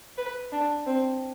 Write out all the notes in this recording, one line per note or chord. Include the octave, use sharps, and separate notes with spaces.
B4
D4
C4